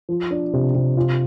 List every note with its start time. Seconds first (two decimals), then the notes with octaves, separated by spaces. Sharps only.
0.09 F3
0.31 D4
0.53 C3
0.75 C3
0.97 F4